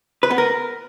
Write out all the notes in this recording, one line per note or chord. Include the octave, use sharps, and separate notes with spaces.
B4
B3
A#4